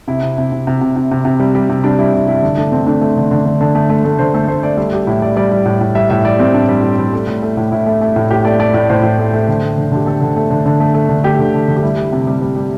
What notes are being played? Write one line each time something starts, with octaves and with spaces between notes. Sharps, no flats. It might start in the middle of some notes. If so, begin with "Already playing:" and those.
C3 E4
C3
C3
C3
C3
C3
C3
C3
C3
G3
G3
C3
G3 D4
G3 E4
C3
G3 E4
D3
A3 D4
D3 C4
A3 D4
A3
D3
D3
D3
D3
A3
A3
A3
D3 C5
A3 A4
A3 C5
A3 D5
G3 E5
G3 G4
A2 E4
G3 D5
G3 D5
G3
A2
A2
G3 E5
A2 E5
G3 D5
G3 C4
A2 D4
G3
A2
G3
A3
A2
A3
A2
A2 E4
A3
A3
A2
A2 G4
A3 D5
A3 D5
A2 D5
A2 C5
A2
A3
A3
D3
A3
D3
D3 G4
A3 A4
D3
A3
D3
D3
A3
A3
D3
A3 G4
D3
D3
D3
G4
G3 E4
G3
C3
G3
G3
G3